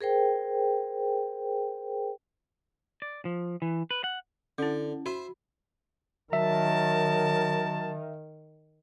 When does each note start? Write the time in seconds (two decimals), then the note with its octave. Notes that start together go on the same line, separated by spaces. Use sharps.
0.01 G#4 A#4 C5 G5
3.02 D5
3.25 F3
3.62 E3
3.91 B4
4.04 F#5
4.58 D3 C#4 E4
5.06 F#4 C5 E5
6.33 D#3 F#3 A#4 E5 A5